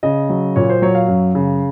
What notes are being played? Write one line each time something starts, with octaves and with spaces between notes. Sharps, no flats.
C#3 D#5
F#3
A#2 C#5
C5
F#3 C#5
F5
F#2
C#3